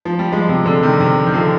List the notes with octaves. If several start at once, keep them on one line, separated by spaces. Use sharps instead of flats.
F3
G3
F3 G#3
C3
D3
C3 D#3
C3
D#3
D3 F3